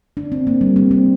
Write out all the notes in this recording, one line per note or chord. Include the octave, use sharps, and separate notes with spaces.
D4
C4
A#3
G3
C4
C4